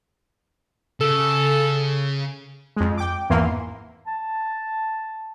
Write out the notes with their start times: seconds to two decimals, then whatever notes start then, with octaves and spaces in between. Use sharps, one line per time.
1.01 C#3 A4
2.77 F2 G#3
2.98 G5 D6
3.30 G#1 E2 E3 A#3 C6
4.07 A5